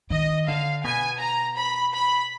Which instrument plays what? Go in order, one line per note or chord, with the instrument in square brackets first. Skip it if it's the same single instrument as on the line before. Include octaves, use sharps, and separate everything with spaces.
[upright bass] D#3 [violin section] D#5
[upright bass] D3 [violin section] F5
[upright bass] B2 [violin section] G#5
[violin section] A#5
B5
B5